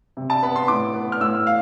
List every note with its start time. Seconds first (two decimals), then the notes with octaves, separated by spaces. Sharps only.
0.17 C3
0.30 A5
0.43 B3 B5
0.56 C6
0.68 A2 D6
0.94 B3
1.12 F6
1.20 A2 E6
1.47 F5